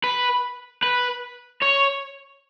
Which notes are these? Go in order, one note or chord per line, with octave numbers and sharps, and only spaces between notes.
B4
B4
C#5